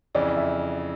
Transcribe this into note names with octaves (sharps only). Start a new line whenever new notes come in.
F2 C#3 E3 D5
E5